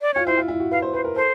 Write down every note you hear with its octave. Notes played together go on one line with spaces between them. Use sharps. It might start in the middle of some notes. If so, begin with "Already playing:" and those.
D5
F4 C#5
E4 C5
F4
E4
F#4
B4 F5
C5
B4 C5
A#4
A4 C5